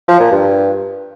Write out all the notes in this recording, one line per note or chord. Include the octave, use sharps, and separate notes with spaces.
F3
A#2
G2